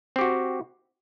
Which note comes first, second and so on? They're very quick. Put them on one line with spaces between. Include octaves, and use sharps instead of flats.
C4 G4 F#4